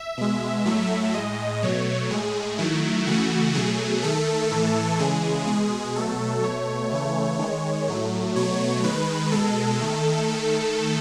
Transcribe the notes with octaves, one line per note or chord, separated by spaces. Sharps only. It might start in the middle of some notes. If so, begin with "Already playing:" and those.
Already playing: E5
B2 G#3
A2 F#3 A3
A2 G#3 D#5
B2 F#3 A3 C#5
A2 G#3 G#4
D#3 F#3 A3 E4
C#3 E3 A3 F#4
B2 F#3 A3 G#4
D#3 A3 A4
A2 E3 A3
C#3 E3 G#3 G#4
B2 G#3 G#4
B2 F#3 A3 A4
B2 A3 C#5
C#3 E3 A3
D#3 G#3
A2 F#3 A3
B2 F#3 A3 C#5
D#3 G#3 B4
B2 G#3 A4
D#3 A3
D#3 A3